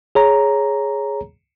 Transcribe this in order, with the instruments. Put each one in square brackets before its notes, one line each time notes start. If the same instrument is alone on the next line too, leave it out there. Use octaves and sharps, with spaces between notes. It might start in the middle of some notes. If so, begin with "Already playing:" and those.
[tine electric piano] G#4 C#5 A#5